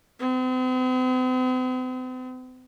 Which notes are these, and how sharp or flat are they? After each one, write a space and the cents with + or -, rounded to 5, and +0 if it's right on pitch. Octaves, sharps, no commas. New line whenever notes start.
C4 -45